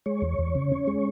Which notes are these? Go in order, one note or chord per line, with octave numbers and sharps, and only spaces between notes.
G#3 C#5
E2
E2
C#3
C#4
G#3